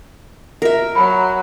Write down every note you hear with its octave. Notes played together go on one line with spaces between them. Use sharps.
A#4 E5
F#3 B5